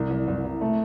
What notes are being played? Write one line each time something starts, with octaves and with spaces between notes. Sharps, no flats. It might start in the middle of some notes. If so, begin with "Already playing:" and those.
Already playing: C2
C2
C2
C2
A3